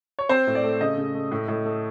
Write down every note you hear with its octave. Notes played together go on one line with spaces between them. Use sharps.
C#5
C4 C5
A2
D5
A3
C#3 D#5
C#3
A3
A2
A2
A3